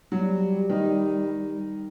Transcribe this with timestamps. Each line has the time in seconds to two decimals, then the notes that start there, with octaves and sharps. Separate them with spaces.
0.12 F#3 G3
0.69 D#3 D#4